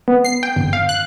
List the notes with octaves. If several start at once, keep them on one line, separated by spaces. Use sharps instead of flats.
B3
C7
G5
G1
F5
F#6